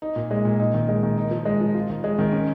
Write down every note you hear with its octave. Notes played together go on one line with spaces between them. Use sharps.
D#4
A#2
G#3
A#2
D#4
D#3
G#3
D#3
D#4
F3
G#3
F3
F4
D#3
G#3
D#3
C#4